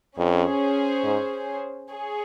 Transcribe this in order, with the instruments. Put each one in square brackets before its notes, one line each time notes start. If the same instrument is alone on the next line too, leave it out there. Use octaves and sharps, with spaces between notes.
[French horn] F2 [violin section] C#4 G#4 C5
[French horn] G#2
[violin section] G#4 C#5